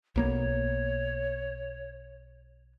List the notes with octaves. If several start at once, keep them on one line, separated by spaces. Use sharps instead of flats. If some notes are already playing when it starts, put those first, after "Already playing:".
B1 A#3 B3 C#5